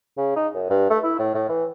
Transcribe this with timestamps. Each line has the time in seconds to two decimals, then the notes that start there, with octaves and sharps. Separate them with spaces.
0.17 C#3
0.36 D#4
0.55 F#2
0.70 G2
0.90 A3
1.03 E4
1.19 A2
1.34 A2
1.49 E3